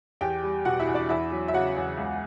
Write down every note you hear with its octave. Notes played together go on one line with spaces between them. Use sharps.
E2 G4 G5
G3
B2 F#4 F#5
E4 E5
E2
D4 D5
E2 E4 E5
F#3
E5
C#3 F#4 F#5
E2
C#2